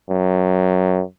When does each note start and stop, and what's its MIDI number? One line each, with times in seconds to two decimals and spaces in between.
0.10 1.02 42